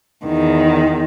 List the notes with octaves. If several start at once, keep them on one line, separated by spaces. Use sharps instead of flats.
E2 D#3